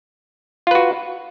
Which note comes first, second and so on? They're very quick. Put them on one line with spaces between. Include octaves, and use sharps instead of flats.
F4 B4 F#4